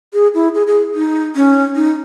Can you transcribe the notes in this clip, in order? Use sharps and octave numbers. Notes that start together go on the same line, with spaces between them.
G#4
E4
G#4
G#4
D#4
C#4
D#4